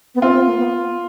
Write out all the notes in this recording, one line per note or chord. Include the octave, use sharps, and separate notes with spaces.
B3
C4 F4
C4
A#3
B3